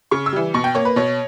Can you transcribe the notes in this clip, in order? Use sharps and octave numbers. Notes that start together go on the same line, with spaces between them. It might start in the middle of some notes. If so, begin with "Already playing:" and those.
C#3 C#6
E6
E3 G3
B2 C#6
G5
A#3 C#5
B4
B2 C#5